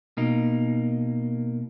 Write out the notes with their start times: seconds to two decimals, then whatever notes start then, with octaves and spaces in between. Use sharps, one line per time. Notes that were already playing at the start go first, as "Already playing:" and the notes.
0.17 B2 A#3 D#4